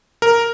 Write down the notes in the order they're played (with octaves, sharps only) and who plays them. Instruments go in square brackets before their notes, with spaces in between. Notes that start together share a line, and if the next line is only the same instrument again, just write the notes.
[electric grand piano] A#4